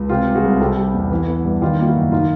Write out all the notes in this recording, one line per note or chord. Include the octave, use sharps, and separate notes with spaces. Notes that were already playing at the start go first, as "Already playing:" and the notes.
Already playing: C#2
C3 F4 G4
G3
F#4 G#4
C2
C3 G4 A4
G3
E2
E3
B3
G2
D#3 F4 G4
A#3 F4
E4 F#4
F#2
D#3 D#4 F4